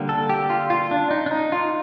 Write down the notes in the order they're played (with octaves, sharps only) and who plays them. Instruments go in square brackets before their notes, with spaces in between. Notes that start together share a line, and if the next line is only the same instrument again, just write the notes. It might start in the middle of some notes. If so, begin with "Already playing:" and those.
Already playing: [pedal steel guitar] D3 G3 A#3
A4
G4
F4
F4
D4
D#4
D4
D#4
F4